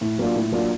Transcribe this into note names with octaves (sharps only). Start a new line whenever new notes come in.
A2
F#3 A#3 D4 F4
A2
F#3 A#3 D4 F4